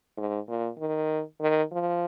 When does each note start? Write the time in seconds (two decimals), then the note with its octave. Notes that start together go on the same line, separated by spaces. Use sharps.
0.17 G#2
0.48 A#2
0.79 D#3
1.41 D#3
1.72 F3